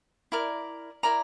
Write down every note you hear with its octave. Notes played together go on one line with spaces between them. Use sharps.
E4 A#4 D5
E4 A#4 D5 A#5